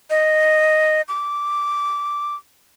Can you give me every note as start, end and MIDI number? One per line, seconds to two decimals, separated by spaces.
0.10 1.02 75
1.08 2.35 86